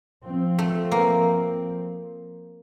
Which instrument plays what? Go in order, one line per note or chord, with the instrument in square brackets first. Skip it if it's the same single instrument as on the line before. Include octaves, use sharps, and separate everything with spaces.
[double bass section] F3 C4
[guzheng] A3
A#3